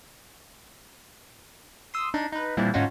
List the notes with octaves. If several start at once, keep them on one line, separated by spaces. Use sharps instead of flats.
C6 D#6 E6
D4 D#4 D#7
D#4 B4
A#2 E3 G3 C4 D4 E4
G#2 D3 C#4 D#4 F4 F#4